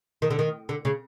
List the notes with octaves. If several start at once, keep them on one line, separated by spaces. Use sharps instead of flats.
D#3
D3
D#3
D3
C#3